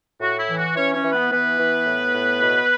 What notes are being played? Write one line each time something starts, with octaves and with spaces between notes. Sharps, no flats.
A2 F#4
E4
E3
F#4
E3 C#4 C#5
C#4 C#5
E3
B3 B4
E3 B3 B4
E3
A2
A2
B2